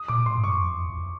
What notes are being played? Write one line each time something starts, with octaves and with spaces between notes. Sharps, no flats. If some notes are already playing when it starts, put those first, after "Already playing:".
Already playing: D#6
A#2 D6
A2 C6
G#2
G2 C#6
F#2
F2
F2